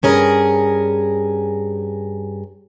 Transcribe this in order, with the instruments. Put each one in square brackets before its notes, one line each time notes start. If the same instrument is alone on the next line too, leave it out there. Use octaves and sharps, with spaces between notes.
[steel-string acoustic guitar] G2 C#4 G#4 A#4